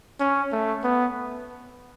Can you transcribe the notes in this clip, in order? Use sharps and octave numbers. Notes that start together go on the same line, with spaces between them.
C#4
A3
B3